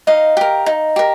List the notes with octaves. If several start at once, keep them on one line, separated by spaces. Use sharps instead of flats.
D#4 D#5 F5
G4 A#4
D#4
G4 A#4